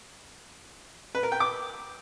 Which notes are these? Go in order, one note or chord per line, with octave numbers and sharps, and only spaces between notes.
B4
A#4
G5
D6